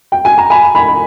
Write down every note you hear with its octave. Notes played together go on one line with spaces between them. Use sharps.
G5
G#5
A#5
G#5 B5
G#5 B5